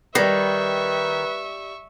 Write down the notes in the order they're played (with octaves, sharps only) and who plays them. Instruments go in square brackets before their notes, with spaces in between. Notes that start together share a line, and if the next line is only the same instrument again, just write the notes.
[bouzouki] D#3 [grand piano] G3 D5 [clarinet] B4 [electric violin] E5 C#6